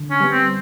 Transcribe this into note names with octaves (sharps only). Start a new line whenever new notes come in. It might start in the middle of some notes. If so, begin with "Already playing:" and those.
Already playing: D3
C#4
G3 B3
C4